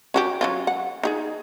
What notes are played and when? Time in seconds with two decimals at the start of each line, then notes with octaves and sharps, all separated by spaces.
0.14 C#4 F#4 G4
0.41 F#3 C#4 F4
0.67 F#5
1.03 D#4 G4 G#4